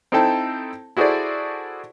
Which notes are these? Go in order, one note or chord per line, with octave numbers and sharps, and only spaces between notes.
C4 D#4 E4 A4 G5 A5
E4 F#4 G#4 A4 C5 D5